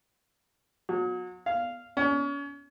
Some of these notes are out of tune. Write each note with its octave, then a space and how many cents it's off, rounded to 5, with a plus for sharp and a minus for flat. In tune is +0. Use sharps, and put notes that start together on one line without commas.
F#3 -35
F5 -10
C#4 +35